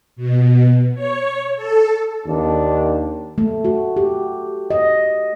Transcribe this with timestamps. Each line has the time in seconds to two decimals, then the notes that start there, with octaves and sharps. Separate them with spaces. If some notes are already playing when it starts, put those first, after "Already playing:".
0.16 B2
0.94 C#5
1.56 A4
2.26 D#2 D4
3.38 A3
3.65 F#4
3.97 G4
4.71 D#5